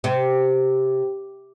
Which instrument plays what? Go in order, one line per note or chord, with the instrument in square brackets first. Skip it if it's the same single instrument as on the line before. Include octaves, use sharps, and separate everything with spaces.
[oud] C3